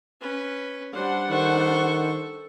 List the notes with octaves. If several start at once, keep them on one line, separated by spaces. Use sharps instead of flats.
C#4 B4
G3 D4 C5 F#5
D#3 A4 C5 C#6